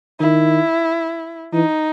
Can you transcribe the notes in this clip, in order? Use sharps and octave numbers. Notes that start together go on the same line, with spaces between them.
D#3 E4
E3 D#4